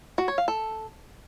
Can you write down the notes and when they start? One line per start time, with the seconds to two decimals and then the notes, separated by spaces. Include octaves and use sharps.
0.18 F#4
0.28 C#5
0.38 F5
0.48 A4